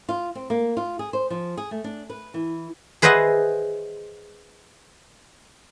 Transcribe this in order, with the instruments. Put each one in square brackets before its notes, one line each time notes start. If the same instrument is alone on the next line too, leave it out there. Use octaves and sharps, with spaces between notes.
[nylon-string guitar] F4
C4
A#3
F4
G#4
C5
F3
G#4
A3
D4
B4
E3
[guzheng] G#4 B4 C5 D#5 E5 F#5